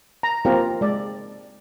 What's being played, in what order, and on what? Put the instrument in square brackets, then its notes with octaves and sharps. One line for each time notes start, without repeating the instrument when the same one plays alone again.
[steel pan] A#5
A#3 C4 F4 G4 A#4
G#3 D5